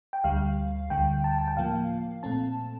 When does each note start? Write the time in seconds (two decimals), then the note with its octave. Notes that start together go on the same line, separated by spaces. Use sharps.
0.13 G5
0.24 D2 D3 G3 F5
0.90 D2 D3 G3 G5
1.24 A5
1.38 A5
1.48 G5
1.57 A2 F3 A#3 F5
2.23 A#2 A3 C4 A5